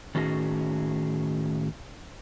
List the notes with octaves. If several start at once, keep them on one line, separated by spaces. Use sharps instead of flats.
A2 D#3 C#4 F#4 G#4